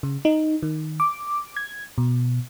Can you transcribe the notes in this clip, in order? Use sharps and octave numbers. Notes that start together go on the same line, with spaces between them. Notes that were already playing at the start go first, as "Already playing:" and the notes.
C#3
D#4
D#3
D6
G#6
B2